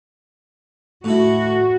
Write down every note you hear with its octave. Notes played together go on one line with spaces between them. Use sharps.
A2 E4 F#4